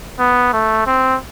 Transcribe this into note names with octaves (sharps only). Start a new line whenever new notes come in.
B3
A3
C4